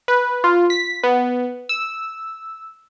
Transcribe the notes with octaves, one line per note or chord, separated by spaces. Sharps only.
B4
F4
B6
B3
E6